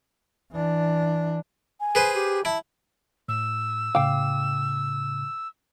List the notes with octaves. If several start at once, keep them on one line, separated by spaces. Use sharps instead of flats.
E3 D4
G#5
G#4 B4 C5
G4
E4 A5
A2 E6
A2 C#3 F5 G5 D6